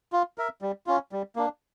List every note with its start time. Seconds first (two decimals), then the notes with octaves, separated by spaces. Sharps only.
0.13 F4
0.38 A#4 E5
0.62 G3
0.87 C#4 F4
1.12 G3
1.36 A#3 D4